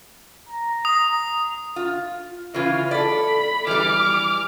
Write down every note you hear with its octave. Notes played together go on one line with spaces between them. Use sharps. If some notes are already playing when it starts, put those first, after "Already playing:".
A#5
D#6
F4
C#3 E3 F4
A4 D5 B5
E3 G3 D6 F6